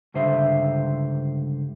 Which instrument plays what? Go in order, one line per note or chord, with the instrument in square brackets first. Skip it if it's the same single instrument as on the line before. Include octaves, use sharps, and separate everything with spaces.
[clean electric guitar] C#2 G2 D3 C5 E5